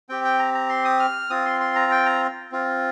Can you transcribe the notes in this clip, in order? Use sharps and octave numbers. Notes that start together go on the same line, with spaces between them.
C4 G4 G5
G5
A#5
A#5
C6
D#6
F6
C4 F4 D#6
C6
C6
A#5
G5
A#5
C4 F4